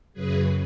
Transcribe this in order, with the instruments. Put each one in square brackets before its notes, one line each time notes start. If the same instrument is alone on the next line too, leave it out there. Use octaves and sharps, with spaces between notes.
[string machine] F#2 C#3 F#3 G#4 B4